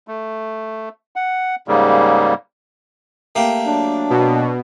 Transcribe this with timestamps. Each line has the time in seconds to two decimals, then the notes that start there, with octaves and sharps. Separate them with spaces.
0.08 A3
1.16 F#5
1.68 G#2 C#3 G3 A#3
3.35 A3 A#3 G4
3.67 F#3 D4
4.10 B2